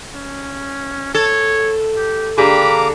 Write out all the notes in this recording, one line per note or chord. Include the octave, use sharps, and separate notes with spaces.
C#4
A4 C#5
G4
D3 A#3 G4 G#4 A#5 B5 D6